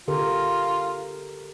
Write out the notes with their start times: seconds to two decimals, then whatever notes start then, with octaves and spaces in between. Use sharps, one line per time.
0.08 D3 F4 G4 A#4